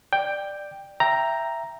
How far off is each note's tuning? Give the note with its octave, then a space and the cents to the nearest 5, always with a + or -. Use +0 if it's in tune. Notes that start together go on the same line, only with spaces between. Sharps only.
D5 +15 G5 +5
E5 +15 G5 +0 A#5 +0